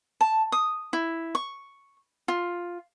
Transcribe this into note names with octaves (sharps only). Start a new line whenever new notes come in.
A5
D#6
E4
C#6
F4